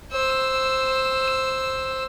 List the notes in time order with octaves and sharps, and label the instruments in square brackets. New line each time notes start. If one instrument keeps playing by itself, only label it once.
[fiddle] C5 E6